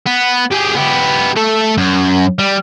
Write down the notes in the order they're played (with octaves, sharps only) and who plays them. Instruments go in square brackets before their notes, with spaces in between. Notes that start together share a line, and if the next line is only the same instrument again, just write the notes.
[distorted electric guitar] B3
G4 G#4
B3 G4
A3 A4
F#2
G3